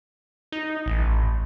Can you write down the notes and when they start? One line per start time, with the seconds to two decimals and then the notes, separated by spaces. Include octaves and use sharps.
0.52 D#4
0.86 A1